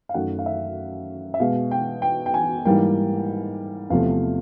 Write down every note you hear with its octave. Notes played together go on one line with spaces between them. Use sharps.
F5
F#2 D#3 F#3 A3 F#5
F5
E5
E5
B2 G#3 F5
G5
G5
G5
G#5
G#2 E3 G3 A#3 G5
E2 C3 F3 A3 F5